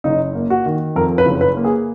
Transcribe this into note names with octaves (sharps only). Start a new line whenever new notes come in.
F#1 D#4
A#3
F#4
D#3
F2 A#4
B4
F#1
B4
A#3
G#4